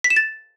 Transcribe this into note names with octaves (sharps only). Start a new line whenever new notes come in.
B6
E7
A6